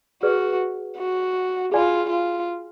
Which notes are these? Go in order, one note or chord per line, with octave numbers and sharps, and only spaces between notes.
F#4 G#4 B4 D5
F#4
F4 G#4 D5 G#5 B5
F4